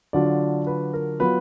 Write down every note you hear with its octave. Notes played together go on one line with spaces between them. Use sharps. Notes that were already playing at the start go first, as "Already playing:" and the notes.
D3 F#3 D4 F4 D5
B4
A#4
F#3 B3 F4 B4